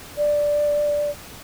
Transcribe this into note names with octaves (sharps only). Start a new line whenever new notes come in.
D5